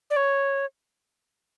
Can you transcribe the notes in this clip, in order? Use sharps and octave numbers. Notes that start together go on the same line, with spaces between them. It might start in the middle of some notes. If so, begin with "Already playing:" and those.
D5
C#5